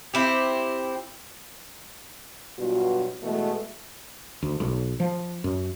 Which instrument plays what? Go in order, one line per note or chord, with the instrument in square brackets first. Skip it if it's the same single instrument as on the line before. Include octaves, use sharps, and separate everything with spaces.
[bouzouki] C4 E4 G4
[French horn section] G2 B2 F#3 F4 F#4
B2 E3 G#3 A3
[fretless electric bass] D2
B1
F3
F#2